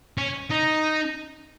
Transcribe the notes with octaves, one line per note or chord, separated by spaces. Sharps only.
C#4
D#4